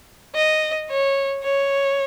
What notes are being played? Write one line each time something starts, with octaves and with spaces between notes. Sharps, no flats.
D#5
C#5
C#5